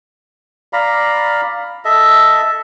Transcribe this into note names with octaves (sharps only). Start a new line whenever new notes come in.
D5 F5 A#5 B5
A4 D#5 E5